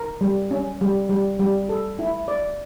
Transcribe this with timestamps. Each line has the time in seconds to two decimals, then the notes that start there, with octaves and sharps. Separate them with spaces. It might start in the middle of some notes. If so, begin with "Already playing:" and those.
Already playing: A#4
0.21 G3
0.51 C#4
0.81 G3
1.09 G3
1.40 G3
1.69 A4
1.99 E4
2.28 D5